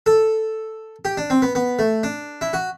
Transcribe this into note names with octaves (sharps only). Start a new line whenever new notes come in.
A4
G4
D4
C4
B3
B3
A3
D4
E4
F#4